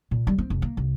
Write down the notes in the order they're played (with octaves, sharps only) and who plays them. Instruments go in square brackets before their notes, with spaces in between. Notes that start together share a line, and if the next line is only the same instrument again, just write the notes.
[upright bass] A#2
G3
C4
F1
A#3
C2